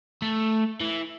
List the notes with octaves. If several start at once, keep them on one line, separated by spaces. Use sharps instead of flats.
A3
E3